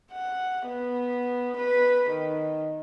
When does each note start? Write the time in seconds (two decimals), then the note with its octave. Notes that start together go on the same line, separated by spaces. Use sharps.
0.12 F#5
0.68 B3
1.58 B4
2.10 D#3